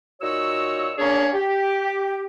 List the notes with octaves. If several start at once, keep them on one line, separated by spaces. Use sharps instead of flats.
A#2 D#4 F#4 C#5 E6
A#3 C#4 D4 G#4 C#5 D5
G4